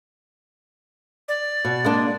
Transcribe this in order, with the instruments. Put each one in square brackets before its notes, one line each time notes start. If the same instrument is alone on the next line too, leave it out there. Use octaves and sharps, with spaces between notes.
[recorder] D5
[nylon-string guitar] B2
G#3 A#3 D4